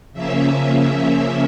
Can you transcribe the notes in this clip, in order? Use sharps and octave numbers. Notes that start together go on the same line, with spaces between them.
C#3 F3 A#3 C#4 E5